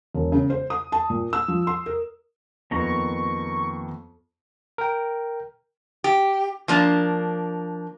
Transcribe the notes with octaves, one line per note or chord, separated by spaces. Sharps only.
E1
C#3
C5
D#6
A5
A#2
E6
F3
C6
A#4
F2 D#3 A#3 B3 A#5 C#6
A#4 G5
G4
F3 A#3 D4